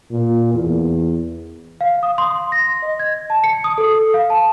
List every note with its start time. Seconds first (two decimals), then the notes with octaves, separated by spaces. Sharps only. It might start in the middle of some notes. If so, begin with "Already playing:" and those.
0.12 A#2
0.54 E2
1.81 F5
2.03 D#6
2.18 C6
2.52 A#6
2.82 D#5
2.99 G#6
3.30 A5
3.44 C#7
3.64 D#6
3.78 A4
4.14 F5
4.30 A5